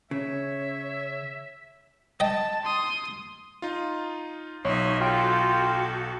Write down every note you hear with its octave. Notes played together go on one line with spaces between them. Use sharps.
C#3 C#5 E5
D#5 G5 A5
C6 D#6
D#4 F4
B1 D#4 C#5 E5 C6
F4 F#4 A4 G5